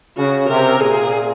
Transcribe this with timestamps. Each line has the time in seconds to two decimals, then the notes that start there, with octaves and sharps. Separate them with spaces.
0.17 C#3 F#4
0.48 C3 A#4
0.80 A#2 G#4